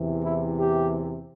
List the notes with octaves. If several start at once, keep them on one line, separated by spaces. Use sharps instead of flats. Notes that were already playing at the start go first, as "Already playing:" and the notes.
Already playing: E2 C3 E3
E4
G4